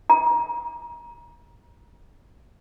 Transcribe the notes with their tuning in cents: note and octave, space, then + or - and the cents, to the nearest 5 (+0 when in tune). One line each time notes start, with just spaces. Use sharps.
A#5 +30